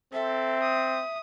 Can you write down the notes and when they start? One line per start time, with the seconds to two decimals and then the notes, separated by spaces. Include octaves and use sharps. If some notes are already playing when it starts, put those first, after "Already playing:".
0.13 C4 A4 E5
0.62 D#6